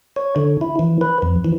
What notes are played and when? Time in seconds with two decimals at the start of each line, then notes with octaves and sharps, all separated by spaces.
0.16 C#5
0.36 D3
0.61 E4
0.79 E3
1.01 B4
1.22 F2
1.45 E3